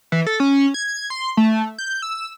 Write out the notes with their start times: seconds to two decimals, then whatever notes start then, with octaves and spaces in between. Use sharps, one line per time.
0.12 E3
0.26 A4
0.40 C#4
0.74 G#6
1.10 C6
1.37 A3
1.78 G6
2.02 E6